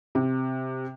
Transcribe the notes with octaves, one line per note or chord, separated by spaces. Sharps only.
C3